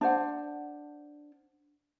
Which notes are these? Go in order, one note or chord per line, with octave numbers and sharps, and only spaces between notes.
D4 C5 F#5